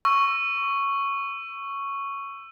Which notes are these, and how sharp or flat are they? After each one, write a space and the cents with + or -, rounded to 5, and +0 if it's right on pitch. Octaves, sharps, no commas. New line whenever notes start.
C#6 +0 E6 +20